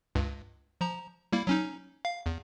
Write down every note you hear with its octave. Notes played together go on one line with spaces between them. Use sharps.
C#2 G2
F3 A#5
G3 A#3 E4
F#3 C#4 D#4
F5
E2